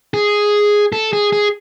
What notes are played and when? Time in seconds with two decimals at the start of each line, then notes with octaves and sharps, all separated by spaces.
0.14 G#4
0.93 A4
1.13 G#4
1.33 G#4